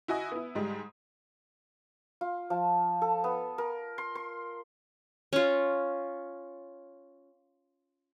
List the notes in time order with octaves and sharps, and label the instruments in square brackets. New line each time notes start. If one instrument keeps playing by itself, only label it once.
[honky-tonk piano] E4 F#4 D#5 G#5 D#6
B3 E4
G#2 G3 G#3
[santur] F4
F3
A4
B3
A#4
C6
C6
[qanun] C#4 F4